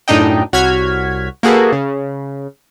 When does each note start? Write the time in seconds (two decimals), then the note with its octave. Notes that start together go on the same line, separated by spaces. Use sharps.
0.08 F#2 A2 D4 D#4 D#5 G5
0.53 C2 F#4 C#5 F6 G#6 B6
1.43 A#3 F#4 G#4 A4 B4
1.72 C#3